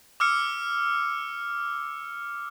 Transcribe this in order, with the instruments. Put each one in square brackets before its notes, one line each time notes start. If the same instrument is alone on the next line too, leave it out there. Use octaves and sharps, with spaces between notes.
[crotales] D6 E6 F6 C#7